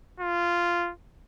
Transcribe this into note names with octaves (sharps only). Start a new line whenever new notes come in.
F4